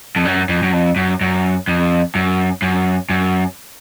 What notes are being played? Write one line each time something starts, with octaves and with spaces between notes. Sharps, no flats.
F2
F#2
F2
F#2
F2
F#2
F#2
F2
F#2
F#2
F#2